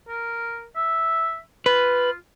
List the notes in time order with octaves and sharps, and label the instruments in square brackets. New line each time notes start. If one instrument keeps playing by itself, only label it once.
[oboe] A#4
E5
[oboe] F4 [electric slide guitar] B4